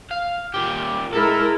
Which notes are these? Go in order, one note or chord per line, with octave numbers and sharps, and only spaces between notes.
F5
A#2 G4
G#3 E4 A4 A#4